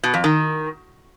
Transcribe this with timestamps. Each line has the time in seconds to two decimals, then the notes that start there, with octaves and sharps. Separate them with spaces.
0.04 B2
0.14 F2
0.24 D#3